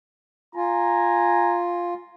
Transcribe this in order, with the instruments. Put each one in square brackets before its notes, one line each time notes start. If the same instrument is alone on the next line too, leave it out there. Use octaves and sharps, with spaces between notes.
[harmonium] F4 [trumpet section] G#5 A#5